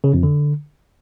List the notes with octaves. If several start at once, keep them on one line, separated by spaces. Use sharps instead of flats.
C#3
F2
D3